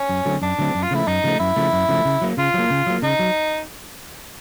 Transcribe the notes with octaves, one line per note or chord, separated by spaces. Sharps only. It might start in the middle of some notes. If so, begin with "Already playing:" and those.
Already playing: C#4
F#2
D3 F#3 A3 C4
F#2 D4
D3 F#3 A3 C4
F#2
F4
C#3 F3 A3 E4
F#2 D#4
C#3 F3 A3
F#2 E4
C#3 F3 A3
F#2
C#3 F3 A3
C#3
F#3 A#3
C#3 F4
F#3 A#3
C#3
F#3 A#3
C#3 D#4
F#3